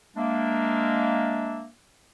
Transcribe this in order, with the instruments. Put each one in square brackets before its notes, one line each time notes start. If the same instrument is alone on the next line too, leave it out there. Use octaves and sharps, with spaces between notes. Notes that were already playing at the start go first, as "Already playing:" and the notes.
[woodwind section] G#3 A#3 D4 E5